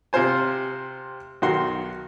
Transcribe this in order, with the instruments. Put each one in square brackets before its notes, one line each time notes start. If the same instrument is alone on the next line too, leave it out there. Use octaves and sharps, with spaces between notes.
[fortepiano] C3 C4 F4 C5 G#5
B1 D#3 F#4 C6